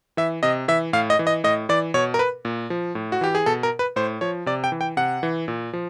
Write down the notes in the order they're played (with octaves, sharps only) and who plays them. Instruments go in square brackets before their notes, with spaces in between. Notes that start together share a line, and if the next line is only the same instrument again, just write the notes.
[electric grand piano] E3 E5
C3 D#5
E3 E5
A2 F5
D#5
E3
D#5
A2 D#5
E3 D5
B2 C#5
A#4
B4
A#2
F3
A2
F#4
E3 G4
G#4
B2 A4
A#4
B4
A2 C5
F3 C#5
C3 D5
G5
E3
G5
C3 F#5
E3
A#2
F3